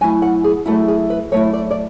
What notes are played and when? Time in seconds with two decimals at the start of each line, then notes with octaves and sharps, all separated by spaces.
0.01 F#3 A3 E4 G#5
0.22 F#5
0.44 G#4
0.66 F#3 A3 E4 F#4
0.88 G#4
1.10 B4
1.32 F#3 A3 E4 C#5
1.53 D5
1.71 D5